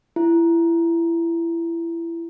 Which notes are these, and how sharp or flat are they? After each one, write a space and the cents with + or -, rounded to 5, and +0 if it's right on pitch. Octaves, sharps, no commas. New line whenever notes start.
E4 +25